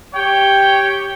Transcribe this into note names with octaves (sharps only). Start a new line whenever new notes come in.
G4 C#5 G5